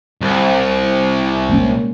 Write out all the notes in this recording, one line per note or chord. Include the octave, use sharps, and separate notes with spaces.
C2
G#3 A#3 C#4